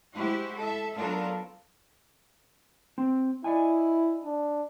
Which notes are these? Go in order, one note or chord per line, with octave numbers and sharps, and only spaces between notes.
G#3 E4 F#4 G4 C5
A4 E5
F#3 B3 D4 F4 A4 A#4
C4
E4 D5 D#5 G#5
D4